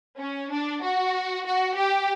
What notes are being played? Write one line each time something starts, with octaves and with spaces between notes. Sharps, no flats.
C#4
D4
F#4
F#4
G4